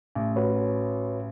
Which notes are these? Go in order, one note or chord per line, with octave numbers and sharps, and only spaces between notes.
A1
F#4 B4 C#5